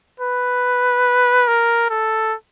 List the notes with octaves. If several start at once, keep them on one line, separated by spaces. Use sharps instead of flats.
B4
A#4
A4